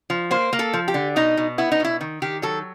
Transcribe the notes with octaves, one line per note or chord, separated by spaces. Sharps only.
F3
A#3 C5
A#3
A4
F3
G4
D3
B2 D#4
B2
B3 E4
D#4
B2 E4
D#3
D#3 G4
F#3 A4